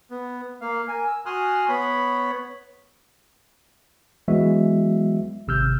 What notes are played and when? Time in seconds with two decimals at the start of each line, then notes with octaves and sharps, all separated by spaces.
0.11 B3
0.61 A#3 F5
0.88 A#4 G#5
1.08 E6
1.26 F#4 G#5 C6 D#6 F6 F#6
1.69 B3 C#5 B5
4.28 E3 F#3 G#3 B3 F#4 E5
5.48 G#1 C3 E6 F6 G6